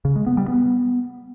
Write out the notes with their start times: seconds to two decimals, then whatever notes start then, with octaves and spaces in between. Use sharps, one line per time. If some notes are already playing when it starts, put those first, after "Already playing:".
0.05 C#3
0.16 G#3
0.26 B3
0.37 G3
0.48 B3